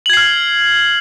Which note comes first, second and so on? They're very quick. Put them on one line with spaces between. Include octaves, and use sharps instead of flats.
F#7 G#6 C7 F6